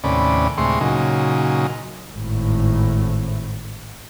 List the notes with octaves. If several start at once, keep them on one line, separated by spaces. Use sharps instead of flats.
D#2 A2 C3 C#4 D5 B5
D2 A2 C3 G#3 C6 C#6
A#2 C#3 F#3 D#4
G#1 A2